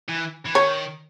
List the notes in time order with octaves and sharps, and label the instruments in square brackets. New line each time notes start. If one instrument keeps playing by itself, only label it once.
[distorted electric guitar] E3
E3
[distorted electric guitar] D#3 [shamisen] C#5